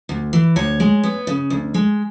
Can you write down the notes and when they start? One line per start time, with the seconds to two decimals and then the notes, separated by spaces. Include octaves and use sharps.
0.09 D2
0.33 E3
0.56 D2 C#5
0.80 G#3
1.03 B3
1.27 C#3
1.50 D2
1.74 G#3